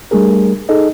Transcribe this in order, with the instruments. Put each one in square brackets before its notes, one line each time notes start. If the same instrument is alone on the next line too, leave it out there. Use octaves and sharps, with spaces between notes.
[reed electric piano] G3 A3 D4 G#4 A#4
D#4 G#4 A4 D#5